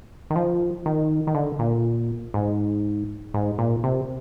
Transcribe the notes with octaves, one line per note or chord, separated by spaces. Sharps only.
D#3
F3
D#3
D#3
D3
A#2
G#2
G#2
A#2
C3